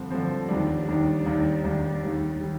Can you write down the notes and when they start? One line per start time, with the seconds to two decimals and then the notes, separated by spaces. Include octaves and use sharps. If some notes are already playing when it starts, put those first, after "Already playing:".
Already playing: G2 D3 F3 C4
0.10 G2 D3 F3 C4
0.49 D#2 D#3 G3 D4
0.87 D#2 D#3 G3 D4
1.25 D#2 D#3 G3 D4
1.64 D#2 D#3 G3 D4
2.03 D#2 D#3 G3
2.41 D#3 G3